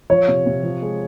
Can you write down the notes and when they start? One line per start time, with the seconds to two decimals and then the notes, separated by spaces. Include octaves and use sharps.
0.10 F3 C#5
0.28 C3
0.46 C3
0.63 F3
0.82 G#3